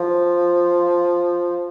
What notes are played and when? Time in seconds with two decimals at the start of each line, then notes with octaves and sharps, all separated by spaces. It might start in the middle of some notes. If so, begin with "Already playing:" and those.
Already playing: F3